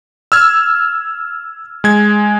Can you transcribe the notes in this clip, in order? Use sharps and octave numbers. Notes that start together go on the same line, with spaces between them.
E6 F6 G#6
G#3 G#6